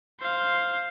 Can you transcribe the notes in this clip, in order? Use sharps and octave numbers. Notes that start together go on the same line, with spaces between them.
C5 F5